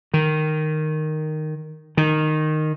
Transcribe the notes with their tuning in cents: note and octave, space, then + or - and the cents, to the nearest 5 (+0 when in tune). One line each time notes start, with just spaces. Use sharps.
D#3 -5
D#3 -10